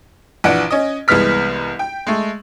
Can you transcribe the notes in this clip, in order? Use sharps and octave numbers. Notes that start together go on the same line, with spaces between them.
A#1 E3 D4 F#5 D7
C#4 D#5
C2 E3 G#3 B3 F6 B6
G5
G#3 A3